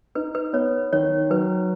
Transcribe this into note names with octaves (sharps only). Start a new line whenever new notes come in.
D#4 B4
B4
B3 C#5
D#3 C#5
F#3 B4